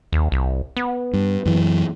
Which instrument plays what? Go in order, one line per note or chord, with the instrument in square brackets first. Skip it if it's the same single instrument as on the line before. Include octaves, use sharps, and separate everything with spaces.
[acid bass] D#2
C2
B3
[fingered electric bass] G2
F#2 E3